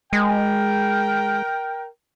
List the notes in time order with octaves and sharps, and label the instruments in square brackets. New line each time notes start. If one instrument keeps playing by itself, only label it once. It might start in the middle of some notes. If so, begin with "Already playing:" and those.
[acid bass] G#3 [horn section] A#4 G5